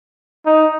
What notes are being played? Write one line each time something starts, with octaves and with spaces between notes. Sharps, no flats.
D#4